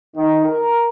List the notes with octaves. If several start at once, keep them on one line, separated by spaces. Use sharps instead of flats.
D#3
A#4